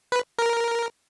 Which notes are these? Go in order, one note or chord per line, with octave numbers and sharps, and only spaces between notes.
B4
A#4